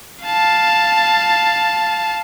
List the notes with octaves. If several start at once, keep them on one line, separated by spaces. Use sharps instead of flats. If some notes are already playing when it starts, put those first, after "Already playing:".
F5 A5